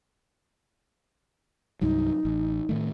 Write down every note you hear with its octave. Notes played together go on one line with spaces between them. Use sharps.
C2 G2 F#3 D#4
A1
A2 D#3 A3